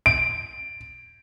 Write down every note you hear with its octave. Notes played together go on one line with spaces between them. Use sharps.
D7